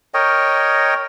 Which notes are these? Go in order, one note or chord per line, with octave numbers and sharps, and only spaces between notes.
A#4 C#5 D#5 G5